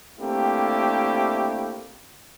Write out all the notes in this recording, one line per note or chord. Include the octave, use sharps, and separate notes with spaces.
A3 A#3 C4 D4 E4 G4